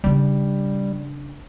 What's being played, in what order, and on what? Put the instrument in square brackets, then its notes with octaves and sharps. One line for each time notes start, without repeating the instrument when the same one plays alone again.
[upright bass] C#3 D4 [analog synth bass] G3